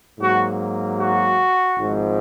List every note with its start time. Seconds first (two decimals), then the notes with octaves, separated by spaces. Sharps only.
0.19 G#2 F#3 A#3 F#4
0.98 F#4
1.77 G#1 G#2 F3